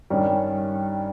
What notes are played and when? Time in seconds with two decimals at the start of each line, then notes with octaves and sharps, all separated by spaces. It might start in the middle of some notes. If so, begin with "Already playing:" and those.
0.10 G2 D#3 G3 C#4